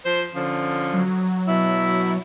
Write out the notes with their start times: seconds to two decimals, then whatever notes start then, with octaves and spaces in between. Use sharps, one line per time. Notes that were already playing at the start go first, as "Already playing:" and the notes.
0.05 F3 C5
0.34 D3 F3 C#4
0.94 F#3
1.48 B2 E4